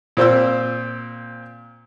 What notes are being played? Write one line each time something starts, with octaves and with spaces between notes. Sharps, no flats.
A#2 C4 C5 E6